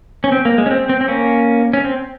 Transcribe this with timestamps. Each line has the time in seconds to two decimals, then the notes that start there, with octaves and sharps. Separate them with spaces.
0.24 C#4
0.32 C4
0.45 A#3
0.58 G#3
0.66 C#4
0.71 C4
0.89 C4
1.01 C4
1.08 A#3 C#4
1.73 C#4
1.85 C4